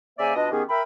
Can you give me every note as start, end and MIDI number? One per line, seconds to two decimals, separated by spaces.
0.18 0.33 49
0.18 0.33 58
0.18 0.33 72
0.18 0.33 74
0.18 0.33 76
0.18 0.33 80
0.35 0.49 47
0.35 0.49 62
0.35 0.49 65
0.35 0.49 75
0.51 0.62 51
0.51 0.62 59
0.51 0.62 61
0.51 0.62 67
0.51 0.62 68
0.69 0.82 70
0.69 0.82 76
0.69 0.82 79
0.69 0.82 83